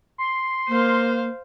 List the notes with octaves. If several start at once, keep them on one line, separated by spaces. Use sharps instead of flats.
C6
A#3 C5 F5